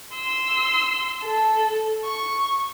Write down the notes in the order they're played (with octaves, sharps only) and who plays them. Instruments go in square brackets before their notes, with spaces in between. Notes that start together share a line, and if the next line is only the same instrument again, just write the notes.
[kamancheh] C6 E6
A4
C#6